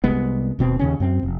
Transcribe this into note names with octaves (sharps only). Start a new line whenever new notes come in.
C2 C3 G#3 B3
D#1 B2 C4
D#2 C#3 C#4
F#2 C4
F1